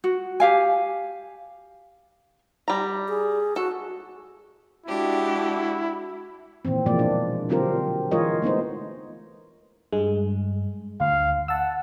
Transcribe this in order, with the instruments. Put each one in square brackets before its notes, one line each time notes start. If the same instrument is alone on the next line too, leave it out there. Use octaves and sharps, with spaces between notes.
[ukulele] F#4
G4 F5 G#5
[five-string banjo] G3 A#5
[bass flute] G#4
[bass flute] F#4 [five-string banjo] A4
[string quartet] G#3 D4 G4 [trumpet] E4 [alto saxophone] F#4
[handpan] A#2 D#3 E3 C4
B2 E3 F3 G#3 A#3 D5
D4
D3 F#3 C4 F4 G4 A#4
E3 G#3 F4 A#4 C#5 D#5
A3 B3 D#4 C5
[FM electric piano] G2 G#3
[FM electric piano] D2 [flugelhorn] F5
[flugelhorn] F#5 [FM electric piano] A5 E6